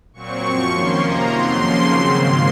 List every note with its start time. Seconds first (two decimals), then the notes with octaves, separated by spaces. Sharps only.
0.14 A#2 F#3 C4 C#6
0.42 F#2 F3 C4
0.70 G#2 D#3 A#3 C#4 C6
0.99 F2 C3 F3 A#3 A#5
1.27 F2 D#3 F#3 C4 C6
1.56 C#3 F3 A#3 C#4
1.84 C#3 F#3 C4 C6
2.13 G#2 D#3 A#3 C6